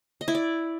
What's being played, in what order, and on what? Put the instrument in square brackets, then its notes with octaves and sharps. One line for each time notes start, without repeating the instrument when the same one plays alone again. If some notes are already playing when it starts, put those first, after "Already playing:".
[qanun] D#5
E4
D5